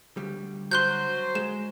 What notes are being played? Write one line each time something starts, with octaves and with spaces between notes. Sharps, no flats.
D2 G3
F#3 C5 C6 F#6 G6
G#3 E7